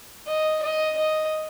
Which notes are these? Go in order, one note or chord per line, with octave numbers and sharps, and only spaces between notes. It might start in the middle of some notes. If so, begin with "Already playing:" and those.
D#5
D#5
D#5